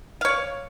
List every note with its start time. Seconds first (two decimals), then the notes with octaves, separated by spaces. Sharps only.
0.21 F5
0.25 C#5
0.28 D5